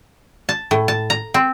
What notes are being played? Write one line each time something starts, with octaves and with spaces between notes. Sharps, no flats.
A5
A2
A5
A#5
C4